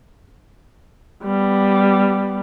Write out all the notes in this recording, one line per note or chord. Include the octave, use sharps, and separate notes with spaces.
G3 B3